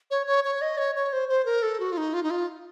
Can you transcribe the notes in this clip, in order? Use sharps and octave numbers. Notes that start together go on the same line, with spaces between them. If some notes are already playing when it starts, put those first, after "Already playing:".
C#5
C#5
C#5
D#5
C#5
C#5
C5
C5
A#4
A4
F#4
F4
D#4
F4
D#4
F4